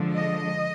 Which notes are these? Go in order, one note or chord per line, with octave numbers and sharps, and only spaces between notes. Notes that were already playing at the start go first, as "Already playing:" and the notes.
Already playing: D3 F3 G#3
D#5